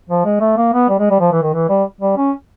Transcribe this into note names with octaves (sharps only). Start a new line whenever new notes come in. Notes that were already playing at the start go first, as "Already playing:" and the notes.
F3
G#3
A3
A#3
B3
G3
G#3
G3
F3
E3
D#3
E3
G3
G3
C#4